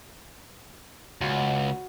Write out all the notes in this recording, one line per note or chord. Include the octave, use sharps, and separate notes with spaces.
C#2 F#4